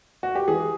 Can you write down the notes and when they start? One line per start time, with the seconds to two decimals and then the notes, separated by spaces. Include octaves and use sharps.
0.23 F#4
0.35 G4
0.48 E3 G#4